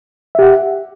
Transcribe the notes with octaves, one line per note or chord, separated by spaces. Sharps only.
G4 E5 F#5